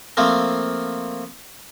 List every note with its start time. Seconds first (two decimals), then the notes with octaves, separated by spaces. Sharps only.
0.17 F3 A3 A#3 C4